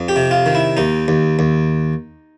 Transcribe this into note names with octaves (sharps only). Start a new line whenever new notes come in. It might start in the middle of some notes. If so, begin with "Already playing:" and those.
Already playing: F2
G4
C3
F4
D#3
E4
D#2 D#4
D#2
D#2